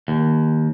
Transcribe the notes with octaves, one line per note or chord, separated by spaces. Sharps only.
D#2